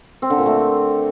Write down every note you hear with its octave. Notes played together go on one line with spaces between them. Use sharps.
C4
D3
A#2
A3